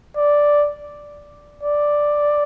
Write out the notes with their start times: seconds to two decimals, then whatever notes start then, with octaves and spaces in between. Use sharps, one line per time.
0.17 D5
1.63 D5